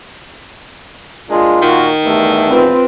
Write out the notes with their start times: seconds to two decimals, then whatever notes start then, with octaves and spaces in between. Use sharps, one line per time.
1.28 G#3 A#3 D4 F4
1.62 A#2 D#3 F#4
2.04 E2 G2 A3
2.48 C4 F4 B4